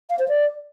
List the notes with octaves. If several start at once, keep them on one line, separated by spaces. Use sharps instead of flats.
F5
C5
D5